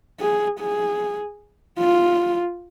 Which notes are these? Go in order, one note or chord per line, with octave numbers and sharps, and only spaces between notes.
G#4
G#4
F4